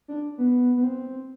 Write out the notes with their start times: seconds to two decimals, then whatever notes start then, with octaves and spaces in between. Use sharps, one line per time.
0.08 D4
0.38 B3
0.76 B3
0.83 C4